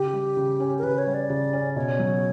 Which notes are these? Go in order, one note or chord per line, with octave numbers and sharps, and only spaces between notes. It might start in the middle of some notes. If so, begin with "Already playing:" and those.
Already playing: C#3 G4
G3
C#3
C#4
A#4
C#3 B4
C#5
G3
D5
C#3
C#4
B2 C#5
F#3